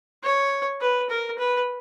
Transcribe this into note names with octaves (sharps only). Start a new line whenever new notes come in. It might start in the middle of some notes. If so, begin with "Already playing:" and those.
C#5
B4
A#4
B4